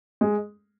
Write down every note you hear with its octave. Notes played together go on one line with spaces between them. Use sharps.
G#3